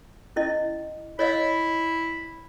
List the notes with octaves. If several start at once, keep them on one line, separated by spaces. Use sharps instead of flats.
C#4 E4 D#5
E4 C#5 D#5 F5